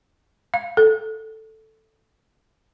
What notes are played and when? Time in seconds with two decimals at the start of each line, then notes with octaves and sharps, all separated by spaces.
0.54 F5
0.77 A4